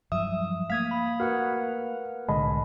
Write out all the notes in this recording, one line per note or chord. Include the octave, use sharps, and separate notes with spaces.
G2 F3 F#3 E5 D#6
A3 A#3 F5 D#6 G#6 B6
B5
F#4 A#4 B4 F#5
C2 A2 D3 G#3 D#5 A5 B5